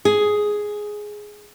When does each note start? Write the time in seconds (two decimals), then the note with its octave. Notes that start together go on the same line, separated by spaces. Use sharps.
0.05 G#4